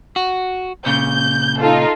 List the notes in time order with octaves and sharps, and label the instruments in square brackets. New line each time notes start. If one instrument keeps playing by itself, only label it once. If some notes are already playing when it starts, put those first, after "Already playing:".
[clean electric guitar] F#4
[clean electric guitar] A#2 C#3 [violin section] G6
[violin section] D#4 F4 A4